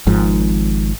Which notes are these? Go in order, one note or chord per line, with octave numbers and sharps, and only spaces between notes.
G#1 G#2 F3